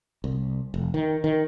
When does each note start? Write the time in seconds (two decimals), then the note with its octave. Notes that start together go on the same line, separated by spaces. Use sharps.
0.24 C2
0.74 F1
0.94 D#3
1.24 D#3